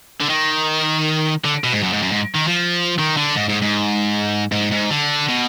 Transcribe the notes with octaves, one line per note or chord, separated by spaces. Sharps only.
D3
D#3
D3
B2
G#2
F#2
G#2
F#2
G#2
D#3
F3
D#3
D3
G#2
G#2
G#2
G#2
G#2
D3
B2